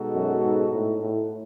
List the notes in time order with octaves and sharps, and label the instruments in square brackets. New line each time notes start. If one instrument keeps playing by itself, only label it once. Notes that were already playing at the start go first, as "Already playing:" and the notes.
Already playing: [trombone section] B2 G#3 D#4 F#4 A4
[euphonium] F#2
G#2
A2
A2